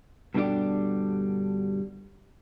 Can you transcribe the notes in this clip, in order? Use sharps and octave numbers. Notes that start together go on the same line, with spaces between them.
G2 B2 D3 G3 D4 G4